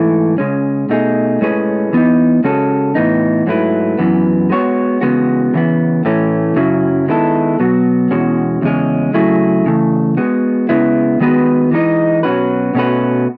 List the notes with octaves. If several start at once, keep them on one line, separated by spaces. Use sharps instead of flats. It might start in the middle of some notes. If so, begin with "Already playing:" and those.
Already playing: G#2 E3 A3
C#3 G#3 C#4
B2 A3 D#4 G#4
A2 G#3 C#4 G#4 B4
E3 B3 D#4
C#3 G#3 C#4 F#4 A4
A2 E3 B3 D#4
G#2 F#3 A3 E4 B4
F#2 E3 B3
G#3 B3 F#4 C#5
E2 C#3 G#3 B3 F#4
C#3 E3 B3
A2 E3 A3 C#4
F#2 C#3 F#3 C#4 E4
D#3 G#3 B3 E4 A4
B2 F#3 B3 F#4
E2 B2 G#3 C#4 F#4
E2 C#3 G#3 C#4
C#3 F#3 A3 E4 G#4
C#3 E3 A3
G#3 B3 F#4
C#3 G#3 B3 E4
D#3 G#3 B3 F#4 B4
E3 G#3 D#4 A4 D#5
B2 F#3 C#4 F#4 B4
B2 A3 C#4 F#4 B4